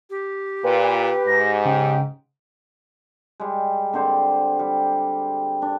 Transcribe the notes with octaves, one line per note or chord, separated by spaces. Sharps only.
G4
A#2 B4 G5
G#2 A#6
C#3 G5
G3 G#3
D3 C4 C5 D5
G3
D4